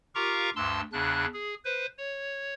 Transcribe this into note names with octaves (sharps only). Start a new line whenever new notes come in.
F4 G4 A#4 F5 A#5 C#6
D2 G2 A5 C6 E6
E2 C#3 D4 F#6
G#4
B4 C5
C#5